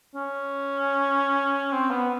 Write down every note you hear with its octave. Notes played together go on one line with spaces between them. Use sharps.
C#4
C4
B3